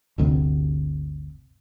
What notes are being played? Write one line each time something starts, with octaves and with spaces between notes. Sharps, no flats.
G1 D2 C3